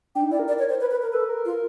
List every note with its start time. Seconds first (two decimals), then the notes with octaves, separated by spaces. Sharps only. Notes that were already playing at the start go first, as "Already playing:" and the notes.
0.15 D4 G5
0.23 D#4
0.31 E4 D5
0.39 A#4
0.48 D5
0.59 C#5
0.69 C5
0.81 B4
0.91 B4
1.02 A#4
1.13 A4 B4
1.29 A#4
1.45 F4